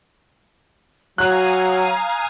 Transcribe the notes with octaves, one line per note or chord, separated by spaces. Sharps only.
F#3 F5 G#5 A#5 D#6 F#6